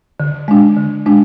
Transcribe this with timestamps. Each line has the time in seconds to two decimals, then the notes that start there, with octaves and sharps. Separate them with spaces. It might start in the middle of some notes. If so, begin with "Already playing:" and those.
0.20 D3
0.48 G#3 D4
0.76 D3
1.06 G#3 D4